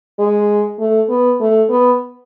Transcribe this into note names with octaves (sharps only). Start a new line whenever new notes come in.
G#3
A3
B3
A3
B3